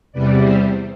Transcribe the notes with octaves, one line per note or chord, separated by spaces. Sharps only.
E2 C3 G3 B4 D5
C5 E5